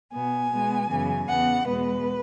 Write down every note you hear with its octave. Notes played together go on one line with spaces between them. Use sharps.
B2 B3 G#5
B2 G#3 B3
F#2 C#3 E3 B3
E2 C#3 E3 B3 F#5
E2 B2 G#3 B3 B4